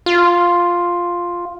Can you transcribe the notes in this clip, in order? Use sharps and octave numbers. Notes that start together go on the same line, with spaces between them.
F4